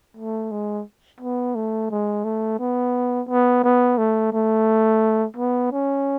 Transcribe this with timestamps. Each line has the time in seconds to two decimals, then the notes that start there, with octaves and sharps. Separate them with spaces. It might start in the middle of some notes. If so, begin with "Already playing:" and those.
0.17 A3
0.51 G#3
1.21 B3
1.55 A3
1.91 G#3
2.24 A3
2.60 B3
3.29 B3
3.64 B3
3.98 A3
4.33 A3
5.37 B3
5.72 C#4